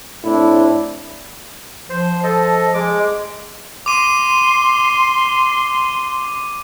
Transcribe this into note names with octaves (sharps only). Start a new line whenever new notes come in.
A2 C4 D4 E4
F3 C5
A4 D#5
G#3 D6
C6 D6 D#7